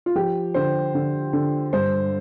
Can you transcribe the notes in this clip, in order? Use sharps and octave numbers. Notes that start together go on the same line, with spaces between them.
F4
F3 G4
D3 C5
D3
D3
G2 C5